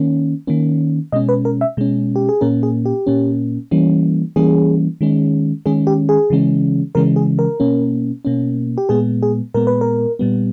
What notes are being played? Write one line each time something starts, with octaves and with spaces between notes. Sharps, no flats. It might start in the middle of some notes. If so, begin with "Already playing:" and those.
Already playing: D#3 A#3 C#4
D#3 A#3 C#4
B2 G#3 C#4 D#5
B4
A#4
E5
B2 G#3 C#4
G4
G#4
A#2 A#3 C#4 A#4
G#4
G4
A#2 A#3 C#4
E3 G3 A#3 C#4
E3 G3 A#3 C#4 G#4
D#3 G#3 C#4
D#3 G#3 C#4 G#4
G4
G#4
C#3 E3 G#3 C#4
C#3 E3 G#3 C#4 A#4
G#4
A#4
B2 A#3 C#4
B2 A#3 C#4
G4
A#2 G#3 B3 G#4
G#4
A#2 G#3 B3 A#4
B4
A#4
A#2 G3 B3